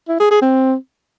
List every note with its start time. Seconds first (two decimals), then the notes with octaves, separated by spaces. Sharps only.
0.09 E4
0.20 G#4
0.31 G#4
0.42 C4